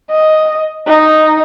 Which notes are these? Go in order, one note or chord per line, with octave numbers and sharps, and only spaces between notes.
D#5
D#4